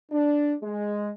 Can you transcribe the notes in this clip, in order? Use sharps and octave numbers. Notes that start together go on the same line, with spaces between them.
D4
G#3